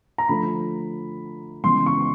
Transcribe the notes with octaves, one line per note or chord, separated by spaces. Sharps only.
A#5
D3 F3 A3 B5
C#3 E3 G#3 B3 C6
C#6